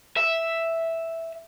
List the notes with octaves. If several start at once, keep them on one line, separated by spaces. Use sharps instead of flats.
E5